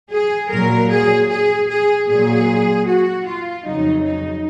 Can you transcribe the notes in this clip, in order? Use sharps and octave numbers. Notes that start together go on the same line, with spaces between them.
G#4
A#2 F#3 A#4
G#4
G#4
G#4
A#2 F#3 G#4
F#4
F4
F2 C#3 F#3 D#4
D#4